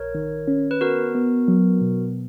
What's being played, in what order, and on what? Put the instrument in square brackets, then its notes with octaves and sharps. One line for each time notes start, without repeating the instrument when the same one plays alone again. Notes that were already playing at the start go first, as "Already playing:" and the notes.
Already playing: [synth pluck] A#1 [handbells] A#4 C#5
[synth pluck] D#3
C#4
[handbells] B4
[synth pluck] B3 [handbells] F#4 A#4
[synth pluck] B3
F#3
B2